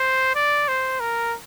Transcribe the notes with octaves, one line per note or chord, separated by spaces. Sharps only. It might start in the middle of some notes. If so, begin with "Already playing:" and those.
Already playing: C5
D5
C5
A#4